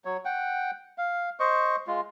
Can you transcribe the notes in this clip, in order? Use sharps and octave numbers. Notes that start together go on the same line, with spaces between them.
F#3 C#5
F#5 G5
F5
C5 D#5 C#6
G#3 F4